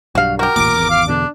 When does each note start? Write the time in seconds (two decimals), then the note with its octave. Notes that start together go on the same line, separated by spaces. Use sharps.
0.15 B1 G2 F#4 F5
0.39 F#4 G4 A#4
0.56 E1 A1 A#2 D6
0.77 G#1 E2
0.90 F5
1.08 E2 B2 D3 D4